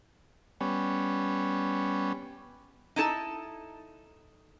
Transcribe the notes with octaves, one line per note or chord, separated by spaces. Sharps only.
G3 B3 C#4
D#4 E4 A4 A5